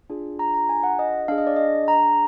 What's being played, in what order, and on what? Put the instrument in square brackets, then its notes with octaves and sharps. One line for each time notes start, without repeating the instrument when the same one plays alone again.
[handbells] D4 F4 G#4
A#5
A#5
G#5
F#5
D#5
D4 G#4 F5
D#5
D5
D#5
A#5